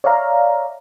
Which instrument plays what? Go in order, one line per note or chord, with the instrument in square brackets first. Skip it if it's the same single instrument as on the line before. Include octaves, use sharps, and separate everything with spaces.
[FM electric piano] C#5 D5 E5 F5 A#5